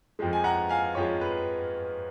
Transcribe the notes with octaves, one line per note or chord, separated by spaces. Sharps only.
F2 F3 G#3
G#5
F#5 A#5
F5 G#5
F2 F3 G#3 C#5
B4